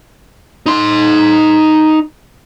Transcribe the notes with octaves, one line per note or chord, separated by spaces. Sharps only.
D#4 C6